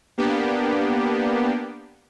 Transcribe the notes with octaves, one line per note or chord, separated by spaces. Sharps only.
A#3 B3 D4 G4